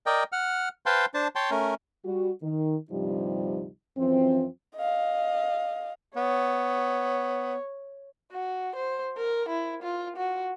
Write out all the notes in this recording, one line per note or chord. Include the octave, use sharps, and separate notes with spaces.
A#4 D5 D#5 G5
F#5 F6
B4 C5 F5 G5 A5 C6
D4 C5 A5
C#5 G5 A5 C6
A3 C#4 A#4
G3 F#4
D#3
D2 G2 C3 F3 G3 D#4
F#2 E3 F3 C4
D#5 F5
B3 C#5
F#4
C5
A#4
E4
F4
F#4